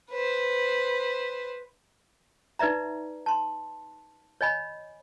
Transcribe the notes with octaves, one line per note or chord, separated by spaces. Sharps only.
B4 C5
D#4 B4 D5 E5 A#5
A5 C6
C#5 D#5 G#5 B5